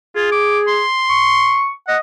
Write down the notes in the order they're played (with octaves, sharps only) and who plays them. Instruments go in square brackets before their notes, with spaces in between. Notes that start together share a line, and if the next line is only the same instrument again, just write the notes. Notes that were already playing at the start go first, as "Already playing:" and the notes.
[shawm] F4 [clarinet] G#4
[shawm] D6
C6
[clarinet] C#6
[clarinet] D#5 [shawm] F#5